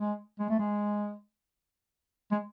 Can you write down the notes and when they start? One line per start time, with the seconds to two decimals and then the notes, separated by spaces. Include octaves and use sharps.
0.01 G#3
0.40 G#3
0.50 A3
0.59 G#3
2.31 G#3